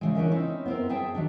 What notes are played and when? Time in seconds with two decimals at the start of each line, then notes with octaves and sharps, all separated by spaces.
0.01 C#3 E3 G#3
0.15 C#4 D4 A#4 E5
0.31 C4 C#4 D#4 E4
0.66 B3 C4 A#4
0.89 F#2 G#4 E5 G5 A5
1.15 D#3 F#3 D4